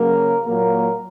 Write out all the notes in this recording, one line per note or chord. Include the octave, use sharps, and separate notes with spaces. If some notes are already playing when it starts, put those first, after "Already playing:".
Already playing: C#3 F#3 A#3 A#4
A#2 F#3 A#3 A#4